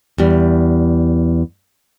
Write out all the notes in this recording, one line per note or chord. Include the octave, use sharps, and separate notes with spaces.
E2 G3